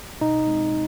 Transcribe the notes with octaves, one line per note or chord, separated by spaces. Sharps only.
B2 D#4
G#3 C4